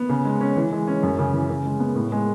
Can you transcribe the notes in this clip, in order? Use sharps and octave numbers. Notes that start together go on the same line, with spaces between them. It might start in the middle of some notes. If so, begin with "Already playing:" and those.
Already playing: B3
C#3
G#3
C#4
E3
G#3
C#4
F#2
C#3
E3
C#3
G#3
B3
A2
G#3